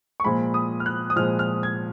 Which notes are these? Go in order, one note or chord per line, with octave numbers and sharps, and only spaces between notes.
C#6
A#2 F3 G#3 B5
D#6
F6
F#6
D#6
A#2 F3 G#3 F6
F6
G#6